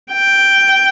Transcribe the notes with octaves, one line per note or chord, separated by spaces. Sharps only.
G5